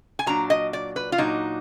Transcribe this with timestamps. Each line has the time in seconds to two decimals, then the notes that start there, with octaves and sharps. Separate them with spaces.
0.19 G#5
0.26 A#2 F#3 D4 A#5
0.50 D#5
0.73 D5
0.96 B4
1.12 F4
1.18 A#2 F#3 D4 D#4